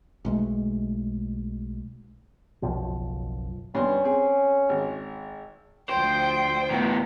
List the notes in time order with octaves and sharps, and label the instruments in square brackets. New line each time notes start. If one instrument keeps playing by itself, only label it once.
[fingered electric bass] B1 G#3 A3
[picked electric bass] F#1 B1 F#2 F3
[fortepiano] G2 B3 C6 [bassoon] C#4
[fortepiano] C4 G#4
G#1
[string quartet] D2 F3 G5 [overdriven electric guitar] C5
[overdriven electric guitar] A2 B3